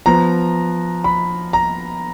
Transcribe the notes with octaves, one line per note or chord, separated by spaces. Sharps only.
F3 B3 A#5
B5
A#5